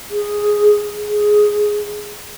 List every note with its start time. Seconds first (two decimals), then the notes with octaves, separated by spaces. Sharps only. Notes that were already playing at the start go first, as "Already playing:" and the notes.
0.11 G#4
1.08 G#4